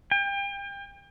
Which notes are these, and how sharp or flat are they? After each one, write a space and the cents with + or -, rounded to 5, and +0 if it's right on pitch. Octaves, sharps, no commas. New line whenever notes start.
G5 +35